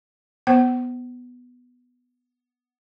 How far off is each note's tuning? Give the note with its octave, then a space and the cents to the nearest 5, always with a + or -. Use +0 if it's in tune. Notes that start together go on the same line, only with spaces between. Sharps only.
B3 +0 C5 +0 F#5 +45